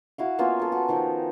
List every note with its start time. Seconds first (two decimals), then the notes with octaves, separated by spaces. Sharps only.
0.18 E4 F#4 F5
0.39 A#3 B3 C#4 F4
0.59 A4 G#5
0.72 F#4
0.88 D#3 F3 D#4 G5